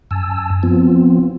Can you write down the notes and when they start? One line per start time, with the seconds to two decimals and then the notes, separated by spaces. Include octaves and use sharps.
0.11 F#2 G#5 A5 E6
0.63 F3 B3 C4 F4